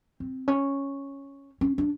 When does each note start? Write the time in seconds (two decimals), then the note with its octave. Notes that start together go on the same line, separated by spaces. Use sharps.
0.20 C4
0.48 C#4
1.61 C#4
1.78 D4